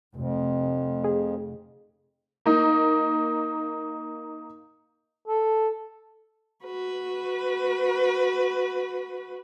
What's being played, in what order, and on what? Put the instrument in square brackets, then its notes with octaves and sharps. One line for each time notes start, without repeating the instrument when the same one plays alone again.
[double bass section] F1 [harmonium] F2
[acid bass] G#4
[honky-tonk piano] A#3 D#4
[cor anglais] A4
[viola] F#4 B4